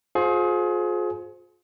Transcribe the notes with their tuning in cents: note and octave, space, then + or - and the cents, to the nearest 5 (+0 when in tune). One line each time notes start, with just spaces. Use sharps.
F4 +35 G#4 +30 C5 +0